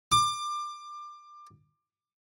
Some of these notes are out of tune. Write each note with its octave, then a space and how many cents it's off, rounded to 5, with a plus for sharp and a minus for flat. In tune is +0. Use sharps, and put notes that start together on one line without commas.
D6 +25